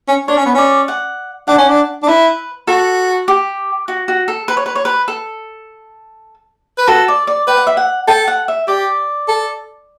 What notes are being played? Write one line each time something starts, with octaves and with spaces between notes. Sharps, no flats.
C#4
D4 C#5
C#4
B3
C#4 D5
F#5
D4 F#5
C#4
D4
D4
E4 B4
F#4 A4
G4
F#4
F#4
A4
B4
C#5
B4
C#5
B4
A4
B4
F#4 A4
D5
D5
B4 G5
F#5
E5
F#5
A4 G5
F#5
E5
G4 D5
A4